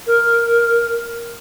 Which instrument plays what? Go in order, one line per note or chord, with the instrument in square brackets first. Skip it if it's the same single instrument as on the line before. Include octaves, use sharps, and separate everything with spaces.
[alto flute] A#4